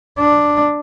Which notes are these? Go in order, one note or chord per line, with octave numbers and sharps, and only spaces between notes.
D4